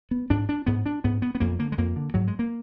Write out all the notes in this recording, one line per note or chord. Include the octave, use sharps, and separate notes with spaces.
B3
G#2 D4
D4
G#2 B3
D4
G#2 B3
B3
B3
F2 A#3
D3 A#3
G#3
F2 A#3
D3
G#2 F#3
G#3
A#3